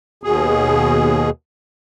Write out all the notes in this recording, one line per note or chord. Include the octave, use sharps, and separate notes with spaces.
D#2 B2 G#4